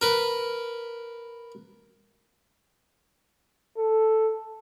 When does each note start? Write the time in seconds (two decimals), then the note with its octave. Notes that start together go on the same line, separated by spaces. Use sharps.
0.02 A#4 B4
3.77 A4